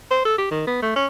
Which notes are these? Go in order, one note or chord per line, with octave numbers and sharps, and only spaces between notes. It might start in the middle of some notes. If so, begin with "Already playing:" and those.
C5
A4
G4
D#3
B3
A3
C#4